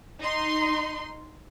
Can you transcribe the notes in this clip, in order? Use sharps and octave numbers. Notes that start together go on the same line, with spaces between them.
D#4 C6